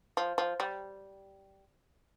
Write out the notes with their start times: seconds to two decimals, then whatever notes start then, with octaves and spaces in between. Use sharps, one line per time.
0.17 F3
0.38 F3
0.60 G3